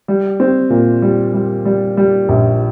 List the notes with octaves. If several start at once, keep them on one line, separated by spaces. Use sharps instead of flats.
G3
C4
A#2
G3
G3
G3
G3
A#1